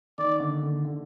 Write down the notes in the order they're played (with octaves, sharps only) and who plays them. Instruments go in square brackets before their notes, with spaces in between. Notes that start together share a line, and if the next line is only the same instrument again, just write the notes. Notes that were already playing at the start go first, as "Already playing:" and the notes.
[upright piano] D#3 [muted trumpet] D5
[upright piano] D3
D3
D3